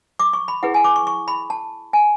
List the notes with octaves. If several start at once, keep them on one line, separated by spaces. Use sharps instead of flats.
D6
C#6
B5
E4 G#4 B4 F#5
G#5
D6
C#6
C#6
B5
A5
G#5